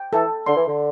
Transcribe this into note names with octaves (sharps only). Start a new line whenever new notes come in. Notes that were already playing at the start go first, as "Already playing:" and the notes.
Already playing: G5
E3 A4
D3 C6
E3
D3